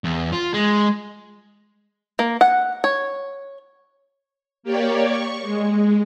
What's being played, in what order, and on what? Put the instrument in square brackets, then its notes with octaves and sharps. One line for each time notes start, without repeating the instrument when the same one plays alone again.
[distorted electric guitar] E2
F4
G#3
[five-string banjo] A#3
F#5
C#5
[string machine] A#3 G4 C#5 D5
C#6
G#3